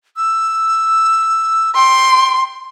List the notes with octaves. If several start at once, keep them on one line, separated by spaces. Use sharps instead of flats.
E6
G5 C6